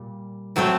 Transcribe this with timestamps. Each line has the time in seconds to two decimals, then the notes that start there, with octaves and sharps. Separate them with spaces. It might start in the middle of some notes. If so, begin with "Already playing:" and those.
Already playing: A#2 G3
0.56 A2 F#3 A3 C4